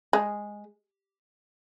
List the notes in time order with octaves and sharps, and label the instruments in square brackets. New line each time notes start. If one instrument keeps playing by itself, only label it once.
[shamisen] G#3